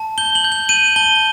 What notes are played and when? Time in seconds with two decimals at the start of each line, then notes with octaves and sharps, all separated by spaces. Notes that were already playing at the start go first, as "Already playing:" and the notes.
Already playing: A5
0.18 G6 G7
0.35 F#7
0.44 G6
0.52 F#7
0.69 G6 D#7
0.96 A5 G7